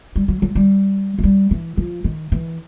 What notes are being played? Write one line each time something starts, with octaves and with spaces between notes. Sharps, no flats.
G3
F#3
F#3
G3
G#3
G3
E3
F3
D#3
E3